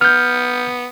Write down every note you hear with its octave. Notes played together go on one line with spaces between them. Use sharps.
B3 F6 G6